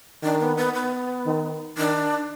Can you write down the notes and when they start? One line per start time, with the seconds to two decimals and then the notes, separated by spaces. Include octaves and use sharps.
0.23 D#3 D4
0.40 B3
0.57 B3
0.74 B3
1.26 D#3
1.77 D#3 D4